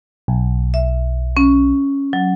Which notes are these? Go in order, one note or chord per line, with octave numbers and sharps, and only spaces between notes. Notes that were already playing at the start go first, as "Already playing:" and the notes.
B1
E5
C#4
F#3